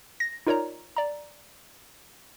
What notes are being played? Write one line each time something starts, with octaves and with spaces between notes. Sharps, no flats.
A#6
D#4 F4 A#4 C#5 D5 A#5
D5 A#5